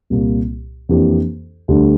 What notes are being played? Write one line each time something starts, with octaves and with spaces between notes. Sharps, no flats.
C2 A#2 G3 A#3
F2 E3 A#3 D4 G4
D2 D3 G3